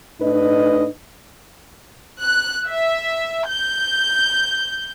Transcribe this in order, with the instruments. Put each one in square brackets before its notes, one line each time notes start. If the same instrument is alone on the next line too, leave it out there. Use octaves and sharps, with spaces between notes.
[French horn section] A2 D4 D#4 B4 D#5
[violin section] F#6
E5
G6